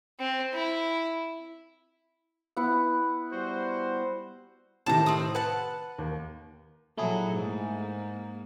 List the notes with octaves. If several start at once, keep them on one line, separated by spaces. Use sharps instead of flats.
C4
E4
B3 E4 F#5
G3 F#4 C5
A2 C3 D#3 A5 A#5
C4 D#6
B4 F#5 A5
D#2
A#2 F#3 A3 E4 G#4
G#2 A#3